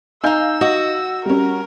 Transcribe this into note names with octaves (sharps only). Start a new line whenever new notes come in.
D#4 F5 G#5 A#5 E6 G6
F#4 D#5 F#5 D#6
G3 C#4 A#4